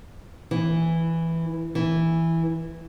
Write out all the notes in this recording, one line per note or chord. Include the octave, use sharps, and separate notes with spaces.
E3
E3